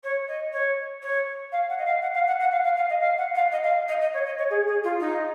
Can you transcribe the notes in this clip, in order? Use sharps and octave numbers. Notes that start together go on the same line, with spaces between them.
C#5
D#5
C#5
C#5
F5
F#5
D#5
F5
F#5
F5
F#5
F#5
F5
F5
F5
D#5
F5
F#5
F5
D#5
F5
D#5
D#5
C#5
D#5
C#5
G#4
G#4
F4
D#4